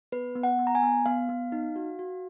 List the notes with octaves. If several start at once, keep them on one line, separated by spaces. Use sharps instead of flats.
B3 B4
B3
F#5
B3
A#5
G#5
B3
B3 F5
B3
D#4
F#4
F#4